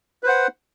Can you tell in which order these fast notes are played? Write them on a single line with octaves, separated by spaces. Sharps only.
B4 C5 F#5